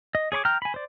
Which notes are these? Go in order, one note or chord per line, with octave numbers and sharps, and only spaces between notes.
D#5
G#4 C#5 B5 D6
G5 A#5 F6
G#5 B5
C5 D5